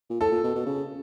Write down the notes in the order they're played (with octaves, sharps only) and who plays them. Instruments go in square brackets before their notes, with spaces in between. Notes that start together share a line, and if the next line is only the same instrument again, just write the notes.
[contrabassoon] A#2
[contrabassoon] A2 [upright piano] A4
[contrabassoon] A#2
B2
B2
C#3